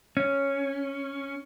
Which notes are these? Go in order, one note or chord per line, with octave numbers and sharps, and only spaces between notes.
C#4